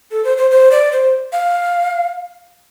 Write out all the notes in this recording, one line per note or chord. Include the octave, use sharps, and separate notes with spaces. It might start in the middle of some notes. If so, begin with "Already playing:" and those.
A4
C5
C5
C5
D5
C5
F5